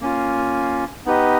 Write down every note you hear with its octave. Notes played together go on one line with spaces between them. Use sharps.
A#3 C#4 F4
B3 D#4 G4 B4 D#5